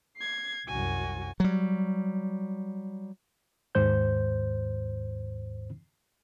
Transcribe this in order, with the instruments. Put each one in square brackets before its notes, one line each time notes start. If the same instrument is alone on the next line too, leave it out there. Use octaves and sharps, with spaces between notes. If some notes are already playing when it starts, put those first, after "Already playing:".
[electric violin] G#6 C7
[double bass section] C2 F#2 [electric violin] F#4 G#5
[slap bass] F#3 G3
[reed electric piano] D#2 G#2 C5 G6